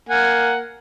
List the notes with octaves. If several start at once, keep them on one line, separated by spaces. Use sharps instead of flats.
A#3 F#5 G#5